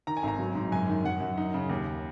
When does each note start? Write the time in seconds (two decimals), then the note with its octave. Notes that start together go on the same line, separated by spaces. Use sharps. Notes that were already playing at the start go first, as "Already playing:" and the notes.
0.07 D#3 A#5
0.17 G#5
0.23 G#1 A#5
0.39 F#3
0.55 G#2
0.72 F#2 G#5
0.88 D#3
1.05 F#2 F#5
1.21 F#2
1.38 D#4
1.54 C#3
1.70 D#2